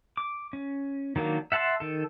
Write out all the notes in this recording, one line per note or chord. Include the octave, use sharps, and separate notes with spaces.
D6
C#4
D#3 F#3 A#3 D4
E5 F#5 A5 B5 C6
D#3 A4